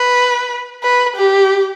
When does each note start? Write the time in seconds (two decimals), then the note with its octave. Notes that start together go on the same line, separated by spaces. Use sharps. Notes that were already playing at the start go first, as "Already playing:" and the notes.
Already playing: B4
0.83 B4
1.16 G4